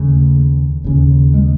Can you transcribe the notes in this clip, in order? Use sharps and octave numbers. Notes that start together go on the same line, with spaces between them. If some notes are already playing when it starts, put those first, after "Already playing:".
Already playing: D#2 C#3 A3
D#2 C#3
G#3